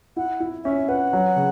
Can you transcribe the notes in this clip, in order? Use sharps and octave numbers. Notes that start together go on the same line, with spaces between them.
E4 F#5
E4
C#4 E5
B4 F#5
F#3
C#3